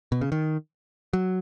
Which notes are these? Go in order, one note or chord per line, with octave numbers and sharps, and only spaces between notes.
B2
C#3
D#3
F#3